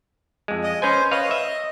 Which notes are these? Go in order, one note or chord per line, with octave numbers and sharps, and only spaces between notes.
F2 G#3
D#5
C#4 B4 C5 G#5
B4 C#5 D#5 F5
E5